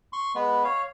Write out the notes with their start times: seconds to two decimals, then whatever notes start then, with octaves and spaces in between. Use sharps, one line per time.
0.13 C6 C#6
0.35 G#3 B3 B4
0.64 C#5 F5